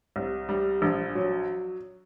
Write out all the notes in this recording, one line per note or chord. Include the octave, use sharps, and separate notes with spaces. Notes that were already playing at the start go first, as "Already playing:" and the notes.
C2
G3
A#1
F#3